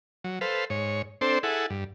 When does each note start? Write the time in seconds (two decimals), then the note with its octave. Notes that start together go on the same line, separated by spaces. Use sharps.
0.24 F#3
0.41 A4 B4 C5 F5
0.70 G#2 C#5
1.21 C4 D4 A4 C5
1.43 E4 G#4 A4 F#5
1.70 G2